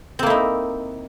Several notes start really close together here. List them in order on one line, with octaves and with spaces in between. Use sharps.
C4 A#3 E4 D#4